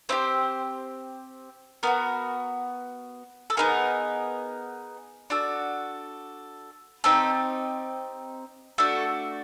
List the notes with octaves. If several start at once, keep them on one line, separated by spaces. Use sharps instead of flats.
C4 D#4 G4 C5
B3 D#4 F#4 A#4
A4
B3 D#4 G#4 A#4
D4 F#4 A4
C4 D#4 G4 A4
A3 D4 F#4 A4